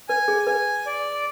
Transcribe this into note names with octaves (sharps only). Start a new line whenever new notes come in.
B4 G#5
G#4
B4 G#5
D5